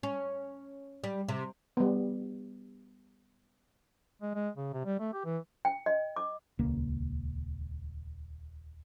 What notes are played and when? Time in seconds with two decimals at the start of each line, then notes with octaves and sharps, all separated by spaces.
0.03 C#4
1.04 G3
1.29 C3
1.77 G3 B3
4.22 G#3
4.35 G#3
4.57 C#3
4.73 C3
4.86 G3
5.00 A3
5.13 G4
5.25 E3
5.65 G5
5.86 D#5
6.16 D6
6.59 D#1 C#2 A#3